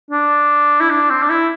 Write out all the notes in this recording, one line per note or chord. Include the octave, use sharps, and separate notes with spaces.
D4
E4
D4
C4
D4
E4